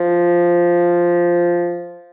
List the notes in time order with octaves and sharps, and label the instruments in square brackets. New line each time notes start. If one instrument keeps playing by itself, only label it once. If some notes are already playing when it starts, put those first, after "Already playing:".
Already playing: [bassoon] F3